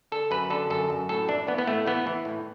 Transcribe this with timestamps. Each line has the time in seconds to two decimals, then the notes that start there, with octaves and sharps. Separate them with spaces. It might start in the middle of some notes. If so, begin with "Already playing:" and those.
0.12 D3 A4
0.31 F#2 B4
0.50 D3 A4
0.70 F#2 A4
0.90 F#2
1.09 A2 A4
1.28 E3 D4
1.47 E3 B3
1.58 B3
1.67 A2 A3
1.87 E3 B3
2.07 E3
2.25 A2